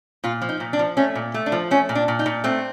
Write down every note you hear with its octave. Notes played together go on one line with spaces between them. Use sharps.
A#2 F4
F3
D#4
A#2
D4
F3
A3 C#4
A#2
A3
D4
F3
A3 C#4
A#2
D4
A#2
D#4
A#2
A3 C4